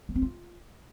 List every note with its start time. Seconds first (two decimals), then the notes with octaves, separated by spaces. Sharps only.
0.09 A#3
0.15 C4
0.22 F4